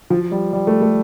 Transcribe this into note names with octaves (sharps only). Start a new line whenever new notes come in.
F3
G3
G3
A3
A3